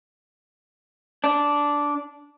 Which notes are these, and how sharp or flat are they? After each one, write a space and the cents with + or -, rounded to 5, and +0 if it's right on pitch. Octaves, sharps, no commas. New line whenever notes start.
D4 -10